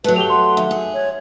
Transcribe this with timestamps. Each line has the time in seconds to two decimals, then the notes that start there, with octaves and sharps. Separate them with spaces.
0.04 F#3 A3 B4
0.16 G4 F7 G7
0.30 F#5 C6
0.57 D#2 E5
0.71 G#4
0.94 C#5